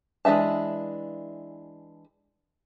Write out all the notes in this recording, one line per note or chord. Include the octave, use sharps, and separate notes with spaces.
E3 G#3 D4 E5 A5